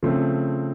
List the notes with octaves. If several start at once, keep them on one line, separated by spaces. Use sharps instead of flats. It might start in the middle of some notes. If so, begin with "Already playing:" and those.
C#3 F3 A3 C4